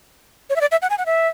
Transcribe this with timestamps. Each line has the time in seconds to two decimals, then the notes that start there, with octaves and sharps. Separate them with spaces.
0.50 C#5
0.56 E5
0.61 D5
0.71 E5
0.82 F#5
0.90 G#5
0.98 F#5
1.06 E5